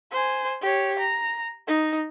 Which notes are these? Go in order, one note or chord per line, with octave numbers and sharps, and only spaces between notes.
C5 G#5
G4 C#5
A#5
D#4